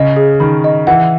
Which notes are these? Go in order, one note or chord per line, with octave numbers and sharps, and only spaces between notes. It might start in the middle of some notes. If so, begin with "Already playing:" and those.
Already playing: C#3 D#5
G#4
D#3 B5
D#5
E3 F#5